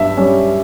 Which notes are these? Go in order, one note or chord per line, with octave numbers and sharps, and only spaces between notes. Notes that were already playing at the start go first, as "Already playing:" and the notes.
Already playing: G2 G3 E5
G3 C#4